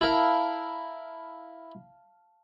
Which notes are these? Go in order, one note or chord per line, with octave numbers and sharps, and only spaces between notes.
E4 A#4 F5 A5